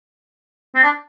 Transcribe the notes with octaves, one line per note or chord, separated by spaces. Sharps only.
C4
D4